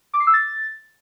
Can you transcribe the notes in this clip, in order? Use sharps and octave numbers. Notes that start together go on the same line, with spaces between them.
D6
C7
E6
A6